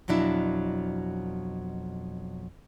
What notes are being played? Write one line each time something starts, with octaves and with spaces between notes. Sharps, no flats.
F2 B2 F#3 D4 E4